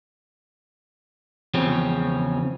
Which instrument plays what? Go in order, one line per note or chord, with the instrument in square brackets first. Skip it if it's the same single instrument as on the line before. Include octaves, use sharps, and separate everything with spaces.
[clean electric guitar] E2 C#3 F3 C4 C#4